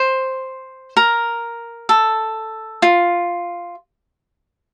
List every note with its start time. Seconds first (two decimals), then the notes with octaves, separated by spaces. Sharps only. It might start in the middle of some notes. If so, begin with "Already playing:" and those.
Already playing: C5
0.97 A#4
1.89 A4
2.82 F4